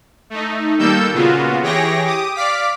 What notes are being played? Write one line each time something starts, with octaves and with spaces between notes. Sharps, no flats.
A3 D#4
D#3 G3 A#3 A4 E6 G6
A#2 C#3 B3 F4 F#4
E3 G4 G#4 C#5 G5 A#6
G4 D6 D#6
D5 F5 D6 B6